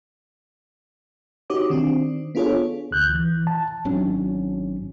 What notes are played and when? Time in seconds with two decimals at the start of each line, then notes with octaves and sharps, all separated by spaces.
1.50 D#4 F#4 G4 C#5 D6 D#6
1.70 D#3 C4 D4
2.35 B3 D4 F4 G#4 A4 C#5
2.91 D2 F#6 G6
3.10 E3
3.47 A5
3.85 G#1 F#3 C#4 D4